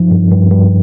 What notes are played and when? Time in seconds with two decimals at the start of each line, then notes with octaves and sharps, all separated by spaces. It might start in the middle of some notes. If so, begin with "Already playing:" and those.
Already playing: G2 F3 D#4
0.11 G2
0.31 G2
0.51 G2